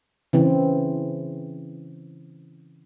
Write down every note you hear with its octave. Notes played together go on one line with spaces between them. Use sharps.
C#3 E3 C4